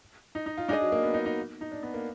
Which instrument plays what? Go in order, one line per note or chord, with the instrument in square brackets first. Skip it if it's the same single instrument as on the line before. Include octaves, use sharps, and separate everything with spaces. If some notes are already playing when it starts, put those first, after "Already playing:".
[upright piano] D#4
D#4
F4
[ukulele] D4 G#4 D#5 [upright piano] D#4
[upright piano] F#3
A#3
B3
D#4
D#4
D#4
D4
B3
A#3